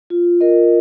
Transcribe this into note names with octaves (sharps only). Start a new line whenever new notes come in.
F4
A#4 D#5